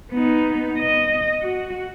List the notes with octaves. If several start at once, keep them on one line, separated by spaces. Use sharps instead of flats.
B3 D#4
D#5
F#4